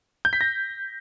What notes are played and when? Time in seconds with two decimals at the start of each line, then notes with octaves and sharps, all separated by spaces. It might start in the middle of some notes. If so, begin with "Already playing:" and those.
0.25 G6
0.33 B6
0.41 A#6